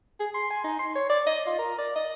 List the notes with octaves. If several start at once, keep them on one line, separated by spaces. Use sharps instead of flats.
G#4
C6
G#5
D#4
C6
C#5
D5
D#5
F4
A#4
D5
D#5